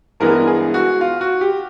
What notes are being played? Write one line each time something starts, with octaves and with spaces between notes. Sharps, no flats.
G2 E3 G#3 B3 A#4
G#4
F#4
F4
F#4
G4